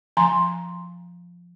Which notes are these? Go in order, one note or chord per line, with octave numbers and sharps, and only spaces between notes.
F3 G#5 A#5 C6